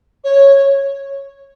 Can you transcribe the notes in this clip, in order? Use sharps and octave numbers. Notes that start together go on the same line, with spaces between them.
C#5